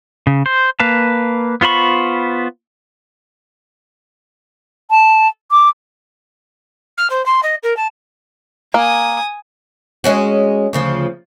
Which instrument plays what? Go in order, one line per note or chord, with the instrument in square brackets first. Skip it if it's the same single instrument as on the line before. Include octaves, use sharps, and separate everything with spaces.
[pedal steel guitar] C#3
C5
A#3 B4 F5 A5
B3 F4 C5 B5 C#6
[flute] A5
D6
[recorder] F6
C5
C6
D#5
A#4
A5
[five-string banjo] A#3 [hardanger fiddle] G#5 D#6
[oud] G#3 C#4 F#4
D2 C#3 F3